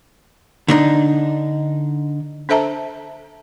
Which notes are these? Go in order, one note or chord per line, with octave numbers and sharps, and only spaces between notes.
D3 D4 D#4
D4 A4 C5 E5 A5 A#5